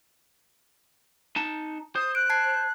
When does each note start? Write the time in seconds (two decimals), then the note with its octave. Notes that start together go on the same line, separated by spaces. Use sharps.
1.36 D#4 A5
1.95 C5 D#6
2.15 F#6 D7
2.30 A5 G#6 C7